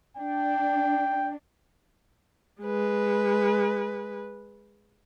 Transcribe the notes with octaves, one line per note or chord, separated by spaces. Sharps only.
D4 G5
G#3 B4